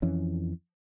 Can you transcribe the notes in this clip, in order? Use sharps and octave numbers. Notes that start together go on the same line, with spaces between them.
F2 E3 C#4